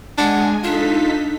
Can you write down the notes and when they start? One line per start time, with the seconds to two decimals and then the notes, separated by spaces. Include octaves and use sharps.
0.18 G#3 D4 F#5 G#5
0.64 D4 D#4 F4 A4 B6